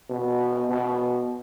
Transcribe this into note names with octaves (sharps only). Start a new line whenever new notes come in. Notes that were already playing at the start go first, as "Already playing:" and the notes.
B2
B2